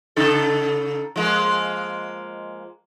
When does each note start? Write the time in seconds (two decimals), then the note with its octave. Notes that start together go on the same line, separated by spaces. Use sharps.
0.16 C#3 D#4 A4
1.16 F3 G#3 A#3